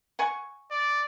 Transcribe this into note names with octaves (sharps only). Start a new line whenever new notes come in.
F#5 G#5 C#6
D5